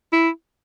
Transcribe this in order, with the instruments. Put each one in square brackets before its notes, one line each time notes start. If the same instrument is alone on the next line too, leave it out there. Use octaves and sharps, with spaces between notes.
[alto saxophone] E4